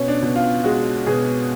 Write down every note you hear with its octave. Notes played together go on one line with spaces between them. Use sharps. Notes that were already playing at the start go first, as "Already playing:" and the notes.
Already playing: B2 C#4
D4
B2
F4
G#3 F#4
B2 G#4